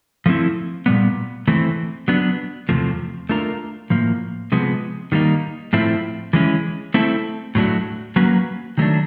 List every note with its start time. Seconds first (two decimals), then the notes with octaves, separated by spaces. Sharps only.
0.26 F3 A3 C4 E4
0.86 A#2 G3 B3
1.48 E3 A3 C4
2.08 F#3 B3 D4
2.69 E2 C3 F3 A3
3.29 A3 D4 F4 A#4
3.90 A2 F3 A#3
4.52 C3 F3 G#3 B3
5.12 D#3 G3 A#3 D#4
5.73 A2 F3 A3 C4 E4
6.33 E3 G#3 C#4 E4
6.94 A3 C4 E4 A4
7.55 A2 F#3 A3 D4 F#4
8.16 F#3 A#3 C#4 F#4 B4
8.78 D#3 F#3 A3 D4